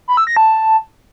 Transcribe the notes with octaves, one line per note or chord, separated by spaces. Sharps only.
B5
E6
A#6
A5